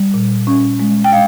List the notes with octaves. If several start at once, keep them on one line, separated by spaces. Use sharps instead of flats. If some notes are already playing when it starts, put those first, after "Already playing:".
Already playing: G3
A#2
C#4
G#3
G5
G#3 F5